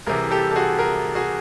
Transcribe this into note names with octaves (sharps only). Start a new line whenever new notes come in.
C2 C3 E3 G#4 A#4
G4 A4
A4
F#4 G#4
G#4 A#4
F#4 G#4